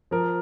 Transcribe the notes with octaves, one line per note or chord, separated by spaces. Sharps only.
F3 A#4